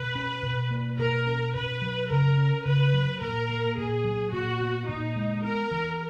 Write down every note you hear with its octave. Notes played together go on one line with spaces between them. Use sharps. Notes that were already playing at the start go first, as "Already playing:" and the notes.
Already playing: B2 B4
C#4
B2
A#3
B2 A#4
C#4
B2 B4
F#3
C#3 A#4
C#4
C#3 B4
F#3
A#2 A#4
A#3
A#2 G#4
F#3
A#2 F#4
B3
A#2 D#4
G#3
B3 A#4
E3